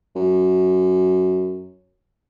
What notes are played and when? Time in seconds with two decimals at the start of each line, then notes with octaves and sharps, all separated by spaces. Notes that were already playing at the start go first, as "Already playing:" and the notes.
0.16 F#2